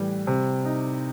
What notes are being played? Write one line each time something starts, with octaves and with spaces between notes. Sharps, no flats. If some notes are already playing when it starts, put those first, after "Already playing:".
Already playing: A2 E3 G3
C3
D#4